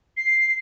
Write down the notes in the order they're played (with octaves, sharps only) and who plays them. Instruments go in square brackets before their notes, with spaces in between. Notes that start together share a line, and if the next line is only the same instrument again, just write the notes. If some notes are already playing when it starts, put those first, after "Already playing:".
[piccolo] C7